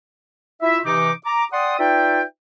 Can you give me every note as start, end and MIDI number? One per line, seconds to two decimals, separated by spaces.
0.62 0.79 64
0.62 0.79 65
0.62 0.79 76
0.85 1.12 48
0.85 1.12 52
0.85 1.12 63
0.85 1.12 86
1.25 1.45 82
1.25 1.45 86
1.53 1.75 74
1.53 1.75 78
1.53 1.75 79
1.53 1.75 84
1.53 1.75 87
1.79 2.23 63
1.79 2.23 65
1.79 2.23 71
1.79 2.23 74
1.79 2.23 76
1.79 2.23 79